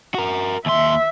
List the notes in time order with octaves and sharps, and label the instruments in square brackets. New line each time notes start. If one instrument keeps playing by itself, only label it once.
[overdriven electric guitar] F#4 A#4
[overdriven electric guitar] D#2 C6 [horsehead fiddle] E5